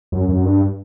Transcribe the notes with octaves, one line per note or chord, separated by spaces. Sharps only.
F#2
F#2
G2